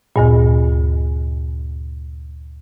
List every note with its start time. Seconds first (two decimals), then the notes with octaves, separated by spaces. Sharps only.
0.16 D2 G2 A#2